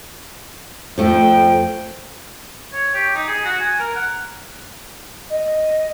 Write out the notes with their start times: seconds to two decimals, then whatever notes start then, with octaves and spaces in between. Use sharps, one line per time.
0.98 F2 F3 A3 G5
2.73 C#5
2.94 G4
3.15 D#4
3.28 G#4
3.45 F#4
3.60 G#5
3.80 A#4
3.95 F#5
5.30 D#5